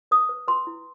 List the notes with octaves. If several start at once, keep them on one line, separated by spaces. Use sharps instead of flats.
B4 D#6
B4
B4 C6
E4